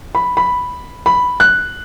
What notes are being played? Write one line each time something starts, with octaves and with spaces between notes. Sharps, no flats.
B5
B5
B5
F#6